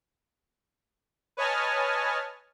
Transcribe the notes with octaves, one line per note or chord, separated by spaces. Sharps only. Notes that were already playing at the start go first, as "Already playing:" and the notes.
B4 C#5 D#5 G#5 A5 F6